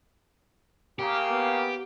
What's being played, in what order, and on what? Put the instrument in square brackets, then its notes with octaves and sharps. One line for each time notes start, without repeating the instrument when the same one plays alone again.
[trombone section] C#3 A#3 [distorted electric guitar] G4
[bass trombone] B3